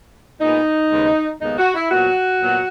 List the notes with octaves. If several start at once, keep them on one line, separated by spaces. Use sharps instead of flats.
A#2 G#3 B3 D#4
D#2 C#3 G#3 B3
D#2 C#3 G#3 B3 D#4
F#4
E4
A#2 F#3 B3 F#4
A#2 F#3 B3